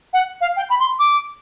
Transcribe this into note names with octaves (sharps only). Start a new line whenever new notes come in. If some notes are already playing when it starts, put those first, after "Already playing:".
F#5
F5
G5
B5
C6
D6